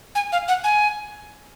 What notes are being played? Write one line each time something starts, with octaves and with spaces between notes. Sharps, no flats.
G#5
F5
F#5
G#5